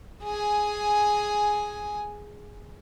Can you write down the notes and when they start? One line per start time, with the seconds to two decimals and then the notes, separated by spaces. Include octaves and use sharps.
0.24 G#4 G#5